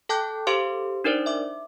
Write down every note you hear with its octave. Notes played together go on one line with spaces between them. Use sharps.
A4 G5 A5 D6 F#6 G6
G4 A4 C5 F5 C6 D6
D4 D#4 A#4 C5 D5
E5 D6